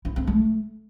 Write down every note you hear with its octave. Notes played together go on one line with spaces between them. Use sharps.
E4
C4
A3